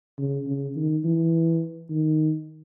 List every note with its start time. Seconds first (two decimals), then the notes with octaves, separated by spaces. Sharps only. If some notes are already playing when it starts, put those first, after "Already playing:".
0.19 C#3
0.47 C#3
0.76 D#3
1.05 E3
1.90 D#3